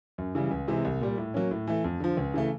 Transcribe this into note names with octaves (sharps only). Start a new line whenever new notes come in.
F#2
C#3 E3 G3
C#2
C3 E3 G#3
C2
A#2 G3
A2
F#3 A#3 C#4
A2
E3 A3
F2
D3 F3
C#2
C#3 E3 A3